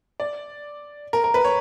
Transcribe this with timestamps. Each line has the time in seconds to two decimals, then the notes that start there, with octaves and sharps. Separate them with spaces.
0.20 D5
1.13 A#4
1.24 A#4
1.34 B4
1.44 C#5